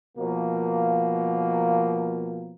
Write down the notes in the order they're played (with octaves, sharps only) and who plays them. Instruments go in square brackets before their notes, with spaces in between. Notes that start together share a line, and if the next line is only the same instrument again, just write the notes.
[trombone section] B2 F3 A#3